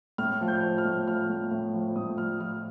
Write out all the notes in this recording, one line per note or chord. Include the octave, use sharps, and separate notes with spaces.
A2 F6
F3
G6
F3
F6
A2
F3 F6
A2
A2
F3
A2 D#6
F3 F6
F3 F6